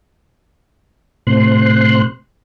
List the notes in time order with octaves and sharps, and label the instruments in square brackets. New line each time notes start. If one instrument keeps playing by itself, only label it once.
[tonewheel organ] A2 C3 C5 C6 F#6